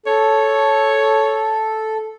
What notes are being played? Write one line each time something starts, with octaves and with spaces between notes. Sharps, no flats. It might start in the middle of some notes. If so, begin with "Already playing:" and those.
A4 C#5